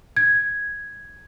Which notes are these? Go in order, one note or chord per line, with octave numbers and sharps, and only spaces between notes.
G#6